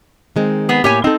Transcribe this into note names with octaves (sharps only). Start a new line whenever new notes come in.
D#3 G#3 C4
B3 G#4
A2 A#3 G4 C#5 G#5
C4 D#4 A4